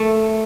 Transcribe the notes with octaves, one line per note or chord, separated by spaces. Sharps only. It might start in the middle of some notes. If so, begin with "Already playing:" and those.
Already playing: A3